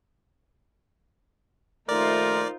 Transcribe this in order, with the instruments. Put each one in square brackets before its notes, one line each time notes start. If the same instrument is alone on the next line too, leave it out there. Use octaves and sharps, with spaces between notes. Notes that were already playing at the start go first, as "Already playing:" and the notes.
[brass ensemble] D#2 F3 A3 [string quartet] D#4 F4 C5 [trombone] A#4 [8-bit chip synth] D5